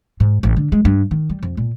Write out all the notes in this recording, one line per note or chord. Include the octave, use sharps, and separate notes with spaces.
G#2
A1
D3
G#3
G2
D#3
G3
F2
A#2